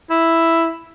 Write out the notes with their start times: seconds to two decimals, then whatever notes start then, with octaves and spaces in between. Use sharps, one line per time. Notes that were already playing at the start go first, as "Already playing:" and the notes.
0.10 E4